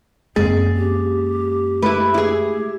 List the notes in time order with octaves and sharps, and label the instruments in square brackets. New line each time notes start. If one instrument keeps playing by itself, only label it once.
[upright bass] F#2 A#3 [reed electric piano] G#3 A6 [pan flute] C4 [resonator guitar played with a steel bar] G#4
[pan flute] G4
[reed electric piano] G#3 A3 [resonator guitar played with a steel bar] E4 B4
[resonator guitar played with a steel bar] E4 G#4